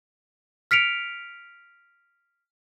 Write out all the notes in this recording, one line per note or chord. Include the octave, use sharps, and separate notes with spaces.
F6 B6 C#7 D7 F7